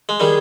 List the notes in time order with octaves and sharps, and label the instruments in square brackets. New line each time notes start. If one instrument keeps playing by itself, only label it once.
[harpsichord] G#3
[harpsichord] D#3 G3 [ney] G#4